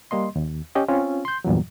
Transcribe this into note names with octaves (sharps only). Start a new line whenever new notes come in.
G3 A#3 D#5 C6
D#2
C#4 G4 D#5
C4 C#4 F4
C6 G6
E2 G2 A#2 E3 F#3